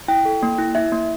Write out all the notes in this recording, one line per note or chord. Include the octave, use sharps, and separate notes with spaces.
E4 G5
A4
A#3
E4
E4 E5
A#3